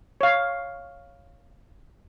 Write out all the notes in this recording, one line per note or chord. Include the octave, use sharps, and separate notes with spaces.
C#5 F5